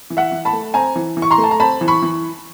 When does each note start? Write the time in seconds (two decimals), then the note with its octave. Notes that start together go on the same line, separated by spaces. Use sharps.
0.10 E3
0.17 E5 F#5
0.32 E3
0.45 A5 B5
0.53 A3
0.74 C4 G#5 A#5
0.96 E3
1.17 E3
1.22 C#6
1.31 A#5 C6
1.38 A3
1.44 A5
1.51 A#5
1.60 C4 A5 B5
1.81 E3
1.88 B5 C#6
2.02 E3